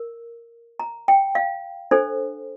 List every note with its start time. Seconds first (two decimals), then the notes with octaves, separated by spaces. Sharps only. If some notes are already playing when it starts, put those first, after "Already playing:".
Already playing: A#4
0.80 A#5
1.08 G5
1.35 F5
1.91 D4 A4 C5